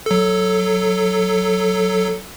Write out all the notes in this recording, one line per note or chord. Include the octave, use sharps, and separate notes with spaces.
F#3 A4